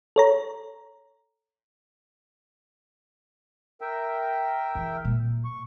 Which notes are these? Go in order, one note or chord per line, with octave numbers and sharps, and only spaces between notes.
A4 C#5 A#5
A#4 E5 G5
E2
A#2 F#3
C#6